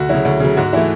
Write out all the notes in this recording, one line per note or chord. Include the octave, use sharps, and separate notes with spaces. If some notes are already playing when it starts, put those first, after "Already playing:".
Already playing: D2 F#4
C#3 F#3 E4
D2
C#3 F#3
G#2 F#4
E3 A3 E4